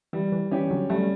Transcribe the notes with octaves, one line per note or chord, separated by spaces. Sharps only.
E3 G3
E3
E3 C#4 G4
D3 F#3
F#3 G3 A3